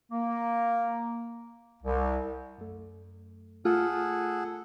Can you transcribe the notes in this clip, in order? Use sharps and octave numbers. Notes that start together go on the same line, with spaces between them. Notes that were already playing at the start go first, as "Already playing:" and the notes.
A#3
C2
F#2 A3
A3 F4 G#4 A4 F#5